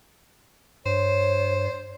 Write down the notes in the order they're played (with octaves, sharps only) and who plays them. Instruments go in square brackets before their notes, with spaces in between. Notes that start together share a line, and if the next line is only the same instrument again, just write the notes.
[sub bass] G2 [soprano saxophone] C5 [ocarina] C#5